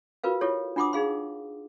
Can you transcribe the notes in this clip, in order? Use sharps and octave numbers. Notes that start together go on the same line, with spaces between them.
F4 F#4 A#4 B4 F5
E4 F4 G4 A4 C#5
D4 F4 F#5 C6 D6 D#6
D#4 G#4 F5 C6